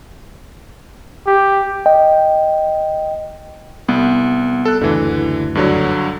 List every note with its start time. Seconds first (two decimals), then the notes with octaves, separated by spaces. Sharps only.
1.27 G4
1.86 D#5 G5
3.88 C2 B3
4.65 A4 F#6
4.81 F#1 D2 D3 E3
5.55 G2 D3 F#3